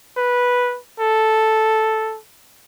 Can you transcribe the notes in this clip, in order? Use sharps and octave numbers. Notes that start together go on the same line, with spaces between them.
B4
A4